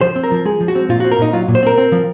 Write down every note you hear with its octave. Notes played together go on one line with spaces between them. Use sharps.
F3 C5
C4
A#4
F3
G#3 G#4
F3
F#4
C4
A#2 F4
F#4
C4
A#4
A#2 D#4
F#3 F4
A#2
C5
C4 A#4
C4
F3